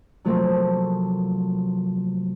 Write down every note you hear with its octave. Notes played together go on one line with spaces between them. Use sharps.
C3 F3 F#3 A3 A#3 C4